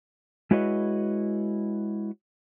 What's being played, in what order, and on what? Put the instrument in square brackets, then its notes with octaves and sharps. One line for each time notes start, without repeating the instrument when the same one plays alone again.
[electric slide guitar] G#3 E4 F#4 B4 C#5 D#5